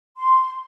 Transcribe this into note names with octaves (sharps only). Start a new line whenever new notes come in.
C6